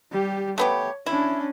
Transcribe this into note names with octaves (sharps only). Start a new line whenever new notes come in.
G3 G4
A3 B3 G4 C#5
C#4 D4 E4